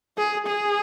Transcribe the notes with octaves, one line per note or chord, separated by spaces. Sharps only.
G#4
G#4